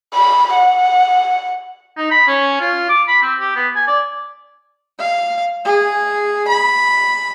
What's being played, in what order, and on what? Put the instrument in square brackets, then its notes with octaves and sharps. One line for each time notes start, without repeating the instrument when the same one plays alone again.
[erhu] B5
F#5
[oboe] D#4
B5
C#4
F4
D6
B5
C4
G4
B3
G#5
D5
[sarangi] F5
G#4
B5